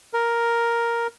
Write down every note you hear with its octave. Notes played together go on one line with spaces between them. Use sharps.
A#4